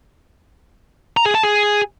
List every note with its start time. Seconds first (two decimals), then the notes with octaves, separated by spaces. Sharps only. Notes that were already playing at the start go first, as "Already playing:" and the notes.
1.17 A#5
1.26 G#4
1.35 A5
1.43 G#4